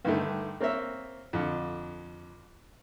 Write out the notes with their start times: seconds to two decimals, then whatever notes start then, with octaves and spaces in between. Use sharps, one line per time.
0.05 G2 D3 D#3 A3
0.60 A#3 C4 C#5 E5
1.33 F2 D3